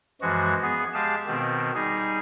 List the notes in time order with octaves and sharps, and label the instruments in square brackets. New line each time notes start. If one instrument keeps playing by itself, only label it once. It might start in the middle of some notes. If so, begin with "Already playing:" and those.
[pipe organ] F#2 E3 F3 G#3 F#4
B3 G#4
G#3 G4 G#4 F5 A5
B2 D#3 B3 C4
G3 D#4 G#4